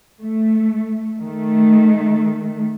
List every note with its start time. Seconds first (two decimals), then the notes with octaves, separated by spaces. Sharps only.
0.20 A3
1.20 D#3 A3